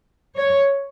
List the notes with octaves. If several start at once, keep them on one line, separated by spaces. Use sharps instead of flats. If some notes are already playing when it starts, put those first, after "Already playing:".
C#5